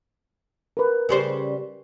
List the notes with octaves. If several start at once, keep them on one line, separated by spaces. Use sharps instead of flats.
A#4 B4
C#3 G3 C5